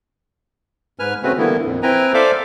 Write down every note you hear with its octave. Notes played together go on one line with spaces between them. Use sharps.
G#2 B4 G#5 F6
C#3 A3 C4 C#4 F#4 B4
D3 E3 G3 A#3 B3 E4
F2 A#2
C4 E4 B4 G5 G#5 A#5
A4 C5 D5 E5 F5 D6